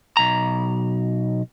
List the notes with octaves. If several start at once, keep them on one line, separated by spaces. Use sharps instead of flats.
B1 A#5